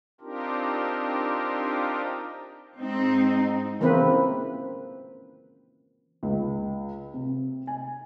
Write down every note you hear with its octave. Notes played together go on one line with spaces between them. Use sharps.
C4 D4 D#4 F4 G4 A#4
G#2 C4 D#4
C#3 E3 A#3 C4 B4
C#2
C3
G#5